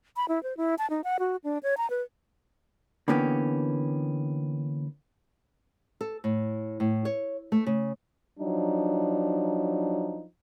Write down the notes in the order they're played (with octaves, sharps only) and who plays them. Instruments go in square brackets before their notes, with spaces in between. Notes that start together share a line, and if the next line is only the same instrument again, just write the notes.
[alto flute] B5
E4
C5
E4
A5
D#4
F#5
F#4
D4
C#5
A#5
B4
[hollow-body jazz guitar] D3 E3 A#3 B3 C#4 G4
[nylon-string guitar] A4
A2
A2
C#5
A3
C#3
[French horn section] F3 F#3 D4 D#4